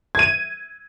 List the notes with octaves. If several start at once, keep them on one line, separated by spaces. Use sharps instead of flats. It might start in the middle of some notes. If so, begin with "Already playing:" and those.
G#6 D#7